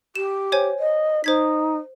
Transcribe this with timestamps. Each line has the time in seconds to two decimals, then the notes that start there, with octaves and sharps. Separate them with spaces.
0.15 G4 E7
0.52 C5 C#5 G#5
0.79 D#5
1.24 D#4 C5 G#6 B6